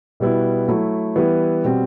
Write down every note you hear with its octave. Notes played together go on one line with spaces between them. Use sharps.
B2 G3 B3 E4
F#3 A3 E4
E3 G3 B3 E4
B2 G3 C4